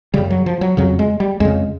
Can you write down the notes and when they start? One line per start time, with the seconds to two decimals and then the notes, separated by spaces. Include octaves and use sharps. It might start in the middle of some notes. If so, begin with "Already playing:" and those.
0.14 F#2 C#3 G3
0.30 F#3
0.46 F3
0.61 F#3
0.77 F2 C#3 F#3
0.99 G#3
1.20 G3
1.40 F2 C#3 G#3